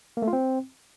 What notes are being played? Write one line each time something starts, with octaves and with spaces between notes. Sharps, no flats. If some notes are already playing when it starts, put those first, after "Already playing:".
A#3
A3
F4
C4